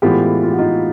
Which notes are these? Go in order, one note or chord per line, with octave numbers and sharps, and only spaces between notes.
A2 E3 G#3 B3 F4 G4
F4
F#4
D#4 F4